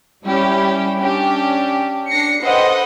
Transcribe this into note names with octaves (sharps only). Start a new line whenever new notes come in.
G3 C#4 E4 G4
C#4 D4 G4
D4 A#6 C7 C#7
A4 B4 C5 D#5 F#5 G5